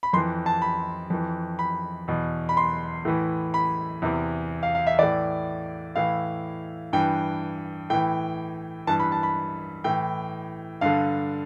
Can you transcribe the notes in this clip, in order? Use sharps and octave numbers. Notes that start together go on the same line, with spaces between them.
B5
F2 E3 C6
A5
B5
F2 E3
B5
E2 B2
B5
C6
A2 E3
B5
E2 C3 E3
F5
F5
E5
A2 E3 D5
A2 E3 F5
G2 E3 G5
A2 E3 G5
G2 E3 A5
B5
A5
B5
A2 E3 G5
G2 D3 F5